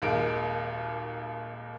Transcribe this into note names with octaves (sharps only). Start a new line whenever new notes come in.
D#1 G#1 D#2 G#3 A#3 D7